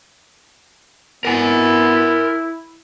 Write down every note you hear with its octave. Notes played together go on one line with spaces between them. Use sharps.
B3 E4 A#4 G#5